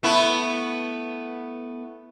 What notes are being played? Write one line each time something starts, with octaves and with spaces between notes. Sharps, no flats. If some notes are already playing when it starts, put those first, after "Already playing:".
A3 B3 E4